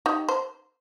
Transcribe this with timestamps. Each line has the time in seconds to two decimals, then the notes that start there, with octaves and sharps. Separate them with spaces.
0.06 D#4 G4
0.29 C5